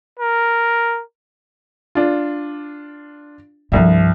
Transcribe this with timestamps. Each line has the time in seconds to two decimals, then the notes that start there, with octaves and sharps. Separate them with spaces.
0.20 A#4
1.95 D4 F4
3.72 C2 G2 F3 E5